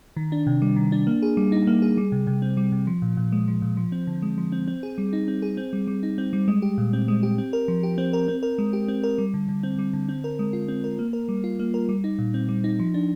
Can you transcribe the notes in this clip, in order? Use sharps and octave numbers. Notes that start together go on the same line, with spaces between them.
D#3
D4
C3
G3
D#3
D4
A#3
G#4
G3
D#4
A#3
G#4
G3
C3
C3
C4
G3
C3
F3
A#2
A#2
G#3
F3
A#2
F3
C4
D3
G#3
F3
C4
C4
G#4
G3
D#4
C4
G#4
C4
G3
G3
D#4
C4
G3
G#3
G4
A#2
C4
G#3
G4
C4
A#4
F3
G4
C4
A#4
C4
A#4
G#3
G4
C4
A#4
G3
D3
D3
C4
G3
D3
C4
A#4
G#3
F4
C4
A#4
A#3
A#4
G3
F4
A#3
A#4
G3
D#4
A#2
C4
G3
D#4
F3
D4